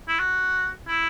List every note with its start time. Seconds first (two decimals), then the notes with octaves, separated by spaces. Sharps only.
0.08 E4
0.19 F#4
0.88 E4